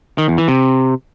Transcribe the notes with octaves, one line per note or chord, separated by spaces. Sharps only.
D#3
E2
E3
C3